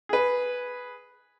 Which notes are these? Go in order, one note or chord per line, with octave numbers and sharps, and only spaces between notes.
G#4 B4